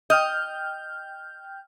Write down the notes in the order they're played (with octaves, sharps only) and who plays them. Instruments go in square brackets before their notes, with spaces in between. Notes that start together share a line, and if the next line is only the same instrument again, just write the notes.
[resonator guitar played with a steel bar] D#5 [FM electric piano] G5 F6 G6